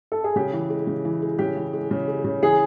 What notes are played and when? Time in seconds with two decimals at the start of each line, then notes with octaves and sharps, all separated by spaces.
0.12 A4
0.24 G#4
0.36 C#3 G4
0.53 E3
0.70 G#3
0.87 C#3
1.05 E3
1.22 G#3
1.39 C#3 G4
1.57 E3
1.73 G#3
1.91 C#3
2.08 G#3
2.24 C#3
2.42 E3 G#4